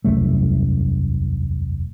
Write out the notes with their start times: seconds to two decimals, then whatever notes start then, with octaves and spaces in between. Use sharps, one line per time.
0.04 E1 C2 F#2 A3